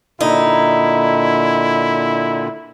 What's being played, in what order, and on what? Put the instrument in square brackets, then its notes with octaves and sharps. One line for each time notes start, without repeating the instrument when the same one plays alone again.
[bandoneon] A#2 D3 [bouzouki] D#4 [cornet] E4